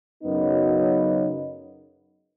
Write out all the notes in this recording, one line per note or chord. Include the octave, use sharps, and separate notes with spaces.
F#2 C#3 F#3 B3 D#4